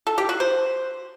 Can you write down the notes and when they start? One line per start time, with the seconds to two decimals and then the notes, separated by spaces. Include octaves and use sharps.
0.07 A4
0.18 G4
0.29 F#4
0.40 C5